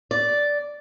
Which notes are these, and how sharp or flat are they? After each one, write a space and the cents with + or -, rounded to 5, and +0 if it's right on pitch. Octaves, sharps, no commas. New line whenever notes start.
D5 -5